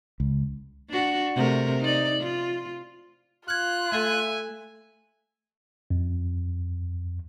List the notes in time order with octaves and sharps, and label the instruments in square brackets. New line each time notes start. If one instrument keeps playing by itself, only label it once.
[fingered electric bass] C#2
[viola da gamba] D4 F#4
C3 A3 A#4
D#4 D5
F4
[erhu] F4 [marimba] F6 G#6 [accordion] F#6
[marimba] A3 A4 [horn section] E5 G#5
[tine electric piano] F2